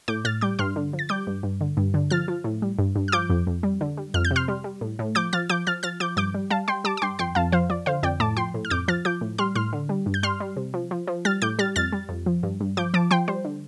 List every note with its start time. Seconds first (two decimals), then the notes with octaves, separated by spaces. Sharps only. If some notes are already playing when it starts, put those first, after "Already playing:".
0.08 A2 D6 G6
0.25 A2 F6 A6
0.41 G3 D6 G6
0.59 G2 C6 F6
0.76 D3
0.93 F3
0.99 A6
1.09 G3 D6 G6
1.27 G2
1.43 G2
1.61 D3
1.77 G2
1.94 D3
2.11 F3 F6 A6
2.28 F3
2.44 A2
2.62 G3
2.79 G2
2.96 G2
3.08 F6
3.12 F3 D6 G6
3.30 F2
3.47 F2
3.63 G3
3.81 D3
3.97 G3
4.14 F2 F6
4.25 G6
4.31 C3
4.36 C6 F6
4.48 G3
4.64 G3
4.81 A2
4.99 A2
5.15 F3 D6 G6
5.33 F3 F6 A6
5.49 F3 D6 G6
5.67 F3 F6 A6
5.83 F3 F6 A6
6.00 F3 D6 G6
6.17 G2 D6 G6
6.34 G3
6.50 G3 F5 A5
6.68 G3 G5 C6
6.84 G3 A5 D6
6.97 D6
7.02 G2 G5 C6
7.19 F2 G5 C6
7.35 F2 F5 A5
7.52 F3 C5 F5
7.70 F3 D5
7.86 D3 C5 F5
8.03 F2 D5 G5
8.20 A2 A5 D6
8.37 F3 G5 C6
8.54 A2
8.65 F6
8.70 F2 D6 G6
8.88 F3 F6 A6
9.05 F3 D6 G6
9.21 A2
9.38 G3 C6 F6
9.55 A2 C6 F6
9.73 D3
9.89 G3
10.06 G2
10.14 G6
10.23 G3 C6 F6
10.40 G3
10.57 C3
10.74 F3
10.91 F3
11.08 F3
11.25 G3 F6 A6
11.42 A2 D6 G6
11.59 G3 F6 A6
11.76 F2 F6 A6
11.92 G3
12.09 F2
12.26 F3
12.43 G2
12.61 G2
12.77 F3 D6 G6
12.94 F3 A5 D6
13.11 F3 G5 C6
13.28 G3 C5
13.45 D3